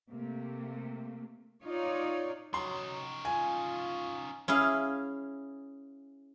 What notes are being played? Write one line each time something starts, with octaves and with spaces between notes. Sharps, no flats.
C3 A3 A#3
D#4 F4 C#5 D5
F#3 C#4 D#4 C6
F4 G#5
C#4 E4 G#4 F5